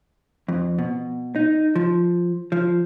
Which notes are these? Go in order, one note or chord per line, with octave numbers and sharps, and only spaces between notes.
F2
B2
D#4
F3
F3